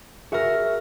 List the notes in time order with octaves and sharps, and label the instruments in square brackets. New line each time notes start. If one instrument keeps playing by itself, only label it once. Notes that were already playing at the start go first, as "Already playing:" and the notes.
[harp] F#4 A#4 [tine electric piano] G#4 E5